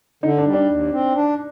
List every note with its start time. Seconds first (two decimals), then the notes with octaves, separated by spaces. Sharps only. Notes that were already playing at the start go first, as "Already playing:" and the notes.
0.23 D3 D#4
0.38 D4
0.46 G3
0.54 D4
0.69 D#2
0.92 C4
1.15 D4